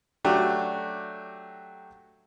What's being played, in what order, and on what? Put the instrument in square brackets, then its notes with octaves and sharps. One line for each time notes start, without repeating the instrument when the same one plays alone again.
[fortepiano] F#3 A3 D4 F#4 G4